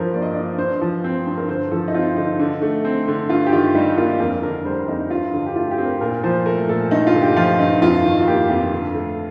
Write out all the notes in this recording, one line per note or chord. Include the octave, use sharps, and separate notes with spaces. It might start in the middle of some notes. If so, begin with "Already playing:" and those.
Already playing: G2 F3 A#4 C5
A#3 D5
D#5
D4 D5
G2 C5
F3
C4
G2
A#4
D3 C5
F3 A4
D#4
C4 F4
D3 D#4
D3
A3
C4
D3
G2 F4
G4
D#3 F4
G3 D#4
A#3 F4
F2 A#4
D3 A#4
G3 C5
F2 D#4
G2 F4
D3
G4
A3 F4
G4
C4
A#4
A#2 A#4
F3 C5
A3 A#4
A#2 A4
G2 D#4
F4
D3
G4
F3 F4
G2 D#4
F2 F4
D#3
F4
A#3 G4
F2 F4
D3
A3